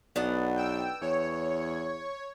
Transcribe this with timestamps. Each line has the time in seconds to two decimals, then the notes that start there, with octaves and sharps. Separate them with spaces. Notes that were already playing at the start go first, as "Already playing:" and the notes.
0.16 B1 B3 D4 F#5
0.56 G5 E6
1.01 E2 C#5